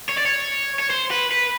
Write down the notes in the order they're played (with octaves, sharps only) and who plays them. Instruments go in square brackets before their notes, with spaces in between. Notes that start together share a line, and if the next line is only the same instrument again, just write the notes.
[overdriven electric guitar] C#5
D5
C#5
C#5
C5
B4
B4